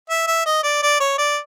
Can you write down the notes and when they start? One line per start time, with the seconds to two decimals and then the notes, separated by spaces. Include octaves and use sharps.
0.10 E5
0.27 E5
0.46 D#5
0.64 D5
0.83 D5
1.00 C#5
1.19 D5